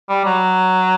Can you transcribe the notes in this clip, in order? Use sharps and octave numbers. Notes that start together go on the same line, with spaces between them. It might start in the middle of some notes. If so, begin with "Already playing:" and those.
G3
F#3